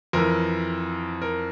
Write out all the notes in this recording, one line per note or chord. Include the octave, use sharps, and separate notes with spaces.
F2 E3 A#4
A#4